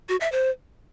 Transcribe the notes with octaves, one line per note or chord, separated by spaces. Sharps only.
F#4
E5
C5